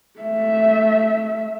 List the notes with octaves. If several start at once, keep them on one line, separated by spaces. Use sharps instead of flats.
A3 E5